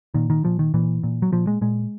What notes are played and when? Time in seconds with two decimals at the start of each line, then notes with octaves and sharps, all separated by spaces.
0.14 A#2 D#3
0.30 D#3
0.44 A#2 F3
0.59 D#3
0.74 A#2 E3
1.03 A#2
1.22 F#3
1.32 A#2 F3
1.47 G#3
1.61 A#2 G#3